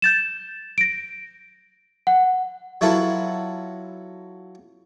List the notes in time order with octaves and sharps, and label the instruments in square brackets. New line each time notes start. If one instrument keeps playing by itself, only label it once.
[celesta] G6 A6 E7
A#6 D7
F#5
[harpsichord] F#3 E4 F4 A4 B4